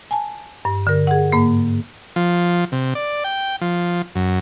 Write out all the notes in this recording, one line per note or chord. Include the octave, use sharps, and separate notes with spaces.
G#5 A5
G2
D3 A#4
G#4 F#5
G#2 A#3
F3
C3
D5
G5
F3
F#2